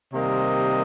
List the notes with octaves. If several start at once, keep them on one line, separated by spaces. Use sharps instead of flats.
C3 D#3 G3 A#3 C5 D#5